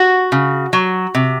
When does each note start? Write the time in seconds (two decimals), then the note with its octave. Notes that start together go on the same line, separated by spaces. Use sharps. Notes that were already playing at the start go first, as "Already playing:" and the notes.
Already playing: F#4
0.32 C#3
0.73 F#3
1.15 C3